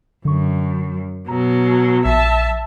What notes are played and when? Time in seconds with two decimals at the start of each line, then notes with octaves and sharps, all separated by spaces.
0.25 F#2 D3 C#6
1.28 B2 F#3 A#5
2.05 A#1 E5 A5 B6